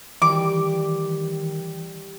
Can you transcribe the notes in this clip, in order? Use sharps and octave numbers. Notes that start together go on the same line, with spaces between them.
D#3 E3 G3 D6